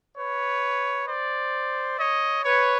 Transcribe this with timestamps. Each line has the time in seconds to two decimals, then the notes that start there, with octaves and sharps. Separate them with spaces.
0.18 B4 C#5
1.08 C5 D5
1.99 C#5 D#5
2.44 B4 C#5